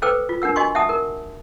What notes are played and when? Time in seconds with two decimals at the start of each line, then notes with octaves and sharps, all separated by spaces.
0.02 A4 B4 C5 G5 D6 E6
0.29 F4
0.42 D4 A#4 F#5 E6
0.56 F#4 D#5 G#5 C6 C#6
0.75 E5 F#5 A5 D#6
0.89 A#4